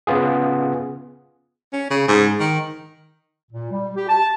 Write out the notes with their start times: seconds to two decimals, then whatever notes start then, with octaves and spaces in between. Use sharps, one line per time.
0.07 C#3 B3 F4 G#4
1.73 C#4
1.90 C#3
2.08 G#2
2.39 D#3
3.51 A#2
3.70 G3
3.95 G4
4.08 A5